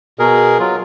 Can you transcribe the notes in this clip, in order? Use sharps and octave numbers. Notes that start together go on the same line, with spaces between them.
B2 G#4 A#4
F#3 F4